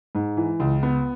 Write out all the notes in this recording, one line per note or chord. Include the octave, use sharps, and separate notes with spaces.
G#2
E3
C#2
B3